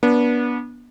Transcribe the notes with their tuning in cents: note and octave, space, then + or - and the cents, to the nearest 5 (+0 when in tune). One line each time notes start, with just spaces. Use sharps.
B3 -30 D4 -20